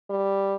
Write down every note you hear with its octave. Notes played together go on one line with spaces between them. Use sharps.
G3